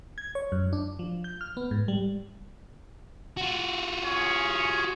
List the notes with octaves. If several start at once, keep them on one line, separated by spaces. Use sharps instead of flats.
G#6
C#5
F#2
D4
F3
G6
F6
B3
G#2
G3
F4 F#4
C#4 G#4 C#5